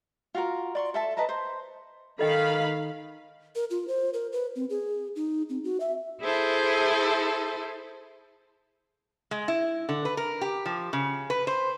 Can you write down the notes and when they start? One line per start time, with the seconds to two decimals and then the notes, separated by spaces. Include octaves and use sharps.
0.35 F4 F#4 A#4
0.75 D5 C6 C#6
0.94 A4 E5 A5
1.17 B4 D#5 A5 A#5
1.29 C5
2.19 D#3 A4 D#5 F5 G5 B5
3.55 A#4
3.70 F4
3.88 C5
4.14 A#4
4.33 B4
4.56 C4
4.70 G#4
5.16 D#4
5.49 C4
5.64 F#4
5.80 E5
6.22 E4 G#4 A4 C5
9.31 G#3
9.48 E4
9.89 D3
10.05 B4
10.17 A#4
10.41 G4
10.66 F3
10.93 C#3
11.30 B4
11.47 C5